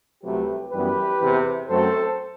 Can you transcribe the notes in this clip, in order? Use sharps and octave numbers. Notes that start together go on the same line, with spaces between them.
C2 C3 F#3 A3 G4 B4
F#2 E3 G3 B3 G4 B4
E2 C3 E3
F#2 F#3 A3 C4 A4 C5